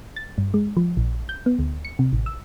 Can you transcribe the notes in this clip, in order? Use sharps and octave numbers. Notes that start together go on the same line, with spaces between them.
A6
G2
G#3
F3
A#1
G6
B3
D2
C#7
C3
A1
E6